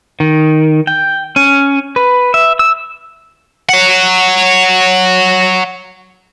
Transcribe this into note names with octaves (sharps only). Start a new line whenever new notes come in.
D#3
G5
C#4
B4
E5
E6
C#5 F#5